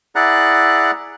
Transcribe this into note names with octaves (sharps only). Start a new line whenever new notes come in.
E4 G#4 D5 F#5 A#5 F#6